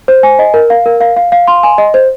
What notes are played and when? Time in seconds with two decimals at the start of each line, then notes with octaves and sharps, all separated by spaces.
0.08 C5
0.23 G#5
0.39 D#5
0.54 A#4
0.70 F5
0.86 A#4
1.01 F5
1.17 F5
1.32 F5
1.48 C6
1.63 G#5
1.78 D#5
1.94 C5